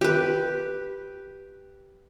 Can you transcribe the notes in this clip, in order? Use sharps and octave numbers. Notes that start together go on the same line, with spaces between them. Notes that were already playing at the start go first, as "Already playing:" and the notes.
G4 B4